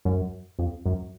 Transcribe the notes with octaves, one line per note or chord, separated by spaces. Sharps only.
F#2
F2
F#2